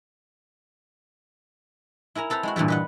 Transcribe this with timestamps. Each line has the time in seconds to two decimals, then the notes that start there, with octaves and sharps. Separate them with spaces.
2.15 E4 A#4 G#5 A#5
2.30 C4 A4 B4 C5 A#5
2.43 G#3 E4 F#4
2.56 G2 A#2 D3 E3 G3
2.68 B4 D#5 F#5